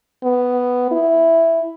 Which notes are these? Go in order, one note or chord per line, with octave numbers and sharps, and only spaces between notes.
B3
E4